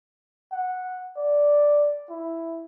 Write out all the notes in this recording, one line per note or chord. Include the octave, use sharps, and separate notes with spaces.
F#5
D5
E4